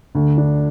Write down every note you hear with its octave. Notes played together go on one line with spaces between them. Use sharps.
D2
D4